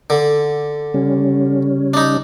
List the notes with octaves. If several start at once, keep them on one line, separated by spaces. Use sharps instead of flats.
D3
C#3 G3 C#4
D4 D#4